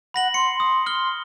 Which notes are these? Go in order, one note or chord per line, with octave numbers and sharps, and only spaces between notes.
F#5 B5 A#6 F#7
C6 C#7
D#6
F6 G7